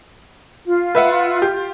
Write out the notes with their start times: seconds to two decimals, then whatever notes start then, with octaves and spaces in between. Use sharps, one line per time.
0.66 F4
0.95 B4 E5 F#5
1.42 G4